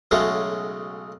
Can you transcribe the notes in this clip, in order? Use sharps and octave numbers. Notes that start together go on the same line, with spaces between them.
B1 C#3 G#3 A3 F#4 F5